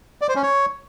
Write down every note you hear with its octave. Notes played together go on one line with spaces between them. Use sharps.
D5
C5
C#4
C#5